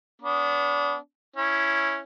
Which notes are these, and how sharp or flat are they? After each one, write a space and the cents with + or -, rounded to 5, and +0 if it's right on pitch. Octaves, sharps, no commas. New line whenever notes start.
B3 +0 D4 -35
C#4 +0 E4 +0